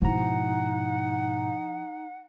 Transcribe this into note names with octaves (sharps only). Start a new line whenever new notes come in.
G#2 B2 F3 D#4 E4 F#5 A#5